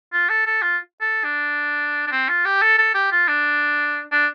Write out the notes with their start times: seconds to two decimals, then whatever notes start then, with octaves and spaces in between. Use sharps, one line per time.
0.13 F4
0.29 A4
0.46 A4
0.62 F4
1.01 A4
1.24 D4
2.07 D4
2.11 C4
2.29 F4
2.45 G4
2.62 A4
2.78 A4
2.94 G4
3.12 F4
3.28 D4
4.12 D4